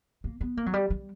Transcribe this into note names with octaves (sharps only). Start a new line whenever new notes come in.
A#3
B3
A#3
F#3
G3
G3